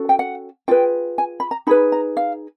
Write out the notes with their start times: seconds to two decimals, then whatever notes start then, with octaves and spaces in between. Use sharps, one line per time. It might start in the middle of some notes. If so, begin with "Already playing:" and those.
Already playing: C#4 F#4 A4
0.09 G5
0.19 F#5
0.68 F4 G#4 B4 G5
1.18 G#5
1.40 B5
1.51 A#5
1.67 D#4 G#4 B4 B5
1.92 A#5
2.17 F5